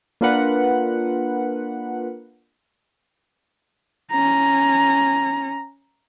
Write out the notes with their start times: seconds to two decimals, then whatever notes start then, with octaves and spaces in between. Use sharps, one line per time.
0.21 A#3 D4 F4 A#4 B4 F#5
4.11 C#4 A#5